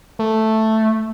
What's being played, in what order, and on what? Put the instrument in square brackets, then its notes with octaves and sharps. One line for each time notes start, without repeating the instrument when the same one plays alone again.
[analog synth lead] A3